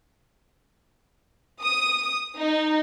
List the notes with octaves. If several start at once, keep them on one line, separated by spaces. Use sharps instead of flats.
D#6
D#4